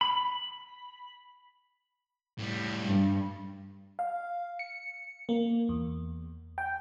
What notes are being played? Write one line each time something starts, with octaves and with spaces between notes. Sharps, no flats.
B5
A2 G3
G2
F5
C#7
A#3
E2
G5